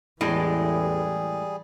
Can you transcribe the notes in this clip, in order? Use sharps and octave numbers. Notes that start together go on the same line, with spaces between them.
A1 E2 A2 E3 G3 G#3 G#4